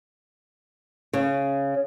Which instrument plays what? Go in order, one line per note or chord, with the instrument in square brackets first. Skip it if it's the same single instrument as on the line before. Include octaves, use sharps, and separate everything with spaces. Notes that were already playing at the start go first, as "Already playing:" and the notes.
[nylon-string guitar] C#3